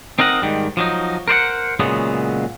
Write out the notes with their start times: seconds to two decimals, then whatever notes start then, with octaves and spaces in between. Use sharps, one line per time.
0.19 C4 D#4 A#4 D#5 F#5
0.42 G#2 D#3 G3
0.77 F3 F#3 D#4
1.28 A#4 C5 D5 F#5
1.80 A#2 C#3 F#3 G#3 B3